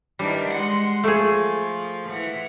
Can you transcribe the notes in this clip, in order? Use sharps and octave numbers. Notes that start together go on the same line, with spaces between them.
D#3 E3 G3 D4
G#3 F#5 C6
F3 A3 G#4
E3 F#5